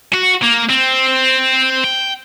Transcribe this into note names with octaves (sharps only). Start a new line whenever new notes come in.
F#4
A#3
C4
G5